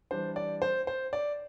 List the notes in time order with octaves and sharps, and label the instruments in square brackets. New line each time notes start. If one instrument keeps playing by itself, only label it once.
[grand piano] E3 G3 D4 C5
D5
C5
C5
D5